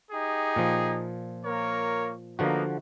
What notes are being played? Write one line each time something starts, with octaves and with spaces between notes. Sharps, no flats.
D#4 G4 G#4
A#2 F3
A#3 A#4 C#5
D3 F3 A#3 B3 D#4 F#4